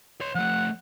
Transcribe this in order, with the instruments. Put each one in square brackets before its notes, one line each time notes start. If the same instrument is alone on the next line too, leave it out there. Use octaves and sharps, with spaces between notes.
[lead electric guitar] C#5 C6
[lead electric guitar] F3 A3 [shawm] F#5